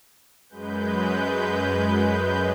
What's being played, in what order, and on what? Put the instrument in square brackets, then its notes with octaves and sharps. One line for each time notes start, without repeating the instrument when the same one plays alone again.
[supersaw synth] F#2 G#3 B4 G6